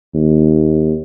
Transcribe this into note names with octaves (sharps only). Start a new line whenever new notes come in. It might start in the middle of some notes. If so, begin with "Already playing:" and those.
D#2